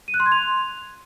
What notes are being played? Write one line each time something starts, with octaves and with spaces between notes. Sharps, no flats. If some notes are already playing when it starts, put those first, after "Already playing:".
D#7
F#6
C6
G#6
F7